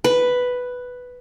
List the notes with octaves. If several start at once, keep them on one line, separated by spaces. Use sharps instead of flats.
B4